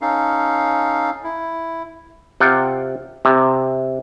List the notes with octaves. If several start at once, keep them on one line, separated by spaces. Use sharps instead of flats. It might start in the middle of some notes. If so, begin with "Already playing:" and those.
C#4 D#4 A4 F5
E4
C3 F4 F#5 G5
C3